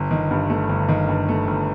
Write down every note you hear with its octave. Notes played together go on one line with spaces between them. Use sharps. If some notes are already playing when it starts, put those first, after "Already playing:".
Already playing: G1
D#3
G2
A3
G1
D#3
G2
A3
G1